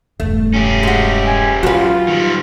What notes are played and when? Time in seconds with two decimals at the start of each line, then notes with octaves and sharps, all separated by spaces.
0.20 E1 G2 A3
0.54 C#4 G4
0.83 G#3 F#4
1.27 G#5
1.63 F#3 F4 F#4 B4
2.08 D#3 G3